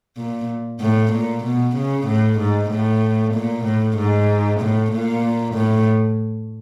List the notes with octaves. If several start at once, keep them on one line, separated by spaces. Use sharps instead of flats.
A#2
A2
A#2
B2
C#3
A2
G#2
A2
A#2
A2
G#2
A2
A#2
A2